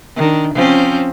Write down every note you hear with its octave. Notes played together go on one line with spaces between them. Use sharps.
D#3 D4
F3 C4 C#4